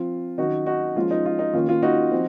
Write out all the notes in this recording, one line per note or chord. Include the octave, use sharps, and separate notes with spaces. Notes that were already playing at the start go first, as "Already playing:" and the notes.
Already playing: F3 C4 F4
D#3 F#3 C#4 D#4 F#4
D#4 F#4
F3 G#3 C#4 F4
D#4
F4
D#4
D#3 A#3 C#4 F4
F4
D#4 F#4
F3 C4